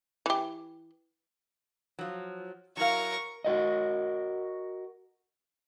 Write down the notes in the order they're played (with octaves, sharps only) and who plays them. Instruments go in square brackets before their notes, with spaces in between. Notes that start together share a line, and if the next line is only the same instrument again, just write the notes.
[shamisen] E3 G4
[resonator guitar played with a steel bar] F3 F#3
[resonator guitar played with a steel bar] F#3 E4 F5 [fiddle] A#4 C#6
[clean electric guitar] F#4 A#4 D#5